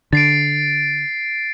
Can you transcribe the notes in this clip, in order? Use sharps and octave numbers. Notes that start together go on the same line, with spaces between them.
D3 A6 C7 D7